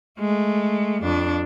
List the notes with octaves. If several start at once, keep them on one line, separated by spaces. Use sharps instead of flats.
G#3 A3
F2 D4